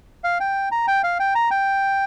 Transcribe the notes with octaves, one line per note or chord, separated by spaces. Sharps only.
F5
G5
A#5
G5
F5
G5
A#5
G5